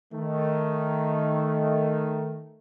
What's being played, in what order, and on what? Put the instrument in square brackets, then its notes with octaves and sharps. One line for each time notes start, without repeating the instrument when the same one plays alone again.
[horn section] D#3 A3